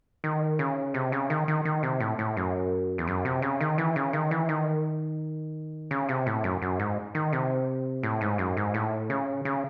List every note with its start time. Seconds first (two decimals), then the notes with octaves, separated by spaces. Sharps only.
0.24 D#3
0.59 C#3
0.94 C3
1.12 C#3
1.30 D#3
1.48 D#3
1.65 D#3
1.83 C3
2.00 A2
2.19 A2
2.37 F#2
2.98 E2
3.08 F#2
3.25 C3
3.42 C#3
3.61 D#3
3.78 E3
3.96 C#3
4.13 D#3
4.31 E3
4.49 D#3
5.91 C#3
6.09 C3
6.26 A2
6.44 F#2
6.62 F#2
6.79 G#2
7.15 D#3
7.33 C3
8.03 A2
8.21 G#2
8.38 F#2
8.57 G#2
8.74 A2
9.10 C#3
9.45 C#3